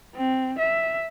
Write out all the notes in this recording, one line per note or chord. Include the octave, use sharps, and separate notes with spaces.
C4
E5